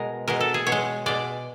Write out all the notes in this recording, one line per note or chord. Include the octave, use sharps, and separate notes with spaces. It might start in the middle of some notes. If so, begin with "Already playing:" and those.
Already playing: B2 G#3 A#4
B2 G#3 A#4
A4
G#4
B2 C#5
G#3
B2 G#3 D5